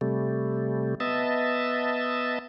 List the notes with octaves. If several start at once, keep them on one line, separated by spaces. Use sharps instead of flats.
C3 G3 A3
B3 D#5 E5 A5